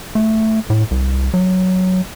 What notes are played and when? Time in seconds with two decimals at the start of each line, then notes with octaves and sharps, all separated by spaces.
0.15 A3
0.70 A2
0.91 C2
1.34 F#3